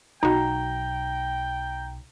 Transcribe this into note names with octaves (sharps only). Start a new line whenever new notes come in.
B1 D#4 F#4 G5 A#5